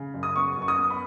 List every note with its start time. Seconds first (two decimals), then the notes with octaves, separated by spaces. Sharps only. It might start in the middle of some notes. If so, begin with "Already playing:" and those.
Already playing: C#3
0.14 F#2
0.23 D#6
0.36 B3 C#6
0.57 F#2
0.62 C#6
0.68 D#6
0.78 B3
0.90 B5